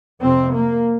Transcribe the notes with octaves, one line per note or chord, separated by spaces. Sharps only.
F2 C3 C4
A#3